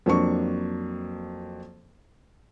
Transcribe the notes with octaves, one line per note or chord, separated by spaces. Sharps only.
F2 F#3 A#3 D4 C#6